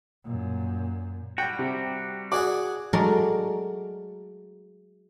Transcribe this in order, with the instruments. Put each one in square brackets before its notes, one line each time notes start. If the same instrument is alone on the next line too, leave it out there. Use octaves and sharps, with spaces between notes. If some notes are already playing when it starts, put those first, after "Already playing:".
[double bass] F#2 A#2
[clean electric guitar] G3 F#4 [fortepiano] G5
[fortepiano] C3
[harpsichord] F#4 G#4 F#5 [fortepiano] D5
[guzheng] F#3 G#3 A3 F#4 A#4 D5